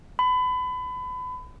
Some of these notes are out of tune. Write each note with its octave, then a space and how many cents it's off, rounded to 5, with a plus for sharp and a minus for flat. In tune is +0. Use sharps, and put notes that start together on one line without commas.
B5 +30